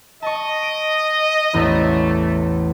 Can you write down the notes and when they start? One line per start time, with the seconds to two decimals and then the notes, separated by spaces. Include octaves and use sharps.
0.22 D#5 A5 C#6
0.63 D7
1.53 A1 E2 A3 B3